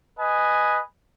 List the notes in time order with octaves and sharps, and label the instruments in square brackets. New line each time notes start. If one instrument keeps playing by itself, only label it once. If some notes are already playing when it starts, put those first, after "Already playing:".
[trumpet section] B4 D#5 G#5